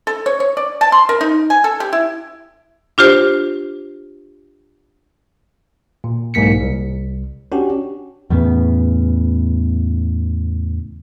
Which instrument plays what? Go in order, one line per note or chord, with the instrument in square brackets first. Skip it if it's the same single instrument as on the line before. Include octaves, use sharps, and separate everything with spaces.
[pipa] A4
C#5
C#5
D5
A5
C6
A#4
D#4
G#5
A4
G4
E4
[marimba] D4 F4 G4 C5
[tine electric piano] A#2
B1 G#2 A#3 B6 C#7
C2
C#4 D4 F#4 G4
[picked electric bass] E2 A2 C#3 B3